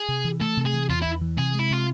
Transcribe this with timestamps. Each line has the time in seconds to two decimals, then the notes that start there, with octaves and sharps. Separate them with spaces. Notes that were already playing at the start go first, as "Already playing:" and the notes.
Already playing: G#4
0.09 C3
0.25 E3
0.41 A3 A4
0.57 C3
0.65 G#4
0.73 E3
0.89 E2 F4
1.02 E4
1.06 E2
1.21 E3
1.38 C3 G#4
1.54 G#3 E4
1.70 C3 F4